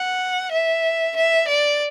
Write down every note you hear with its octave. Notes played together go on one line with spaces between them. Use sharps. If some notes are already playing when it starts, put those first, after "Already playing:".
Already playing: F#5
E5
E5
D5